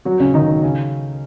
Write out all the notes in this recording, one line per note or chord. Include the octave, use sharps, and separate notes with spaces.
F#3 F#4
C#3 C#4
D#3 D#4
C#3 C#4